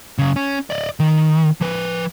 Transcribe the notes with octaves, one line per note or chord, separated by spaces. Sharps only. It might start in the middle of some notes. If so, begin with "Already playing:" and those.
F#2 C#3
C#4
D5 D#5
D#3
F3 B4